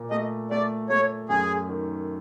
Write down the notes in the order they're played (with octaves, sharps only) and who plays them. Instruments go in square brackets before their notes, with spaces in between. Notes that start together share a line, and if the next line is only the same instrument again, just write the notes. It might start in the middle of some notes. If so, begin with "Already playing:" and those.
Already playing: [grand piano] A#2
[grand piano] A3 [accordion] D#5
[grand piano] A3 [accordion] D5
[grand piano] A3 [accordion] C#5
[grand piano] F#2 [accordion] G#4
[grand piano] D#3